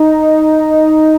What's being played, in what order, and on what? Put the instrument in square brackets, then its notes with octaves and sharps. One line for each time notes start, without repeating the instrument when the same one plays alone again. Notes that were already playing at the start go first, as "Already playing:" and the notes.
Already playing: [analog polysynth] D#4